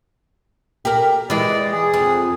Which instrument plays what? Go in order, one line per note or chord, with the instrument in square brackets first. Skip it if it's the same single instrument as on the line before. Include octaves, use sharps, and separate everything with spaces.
[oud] G4 A#4
[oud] E3 G#3 [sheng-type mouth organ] D5
[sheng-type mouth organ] G#4
[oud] F2